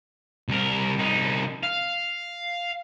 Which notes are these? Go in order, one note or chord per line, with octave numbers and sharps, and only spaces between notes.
C2 A#4
C2 D#4
F5